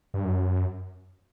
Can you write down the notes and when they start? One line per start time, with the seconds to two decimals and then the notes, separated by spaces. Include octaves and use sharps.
0.14 G2
0.25 F#2